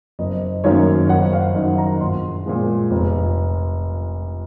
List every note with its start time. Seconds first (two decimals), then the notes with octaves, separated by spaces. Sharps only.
0.19 F#1 D#5
0.64 F#2 D#3 A#3 C#4 C#5
1.09 F#1 F#5
1.33 F5
1.55 F#2 D#3 F#3 D#5
1.78 A#5
2.00 A#1 C6
2.46 A#2 F3 G#3
2.91 F1